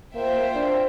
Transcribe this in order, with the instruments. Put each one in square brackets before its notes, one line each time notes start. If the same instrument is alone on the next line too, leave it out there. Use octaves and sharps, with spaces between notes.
[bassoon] A#3 [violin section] F4 C5 E5 G5
[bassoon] A#3
D4